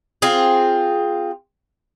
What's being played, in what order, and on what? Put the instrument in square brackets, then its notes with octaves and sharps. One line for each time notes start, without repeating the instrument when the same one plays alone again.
[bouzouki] C4 F4 G#4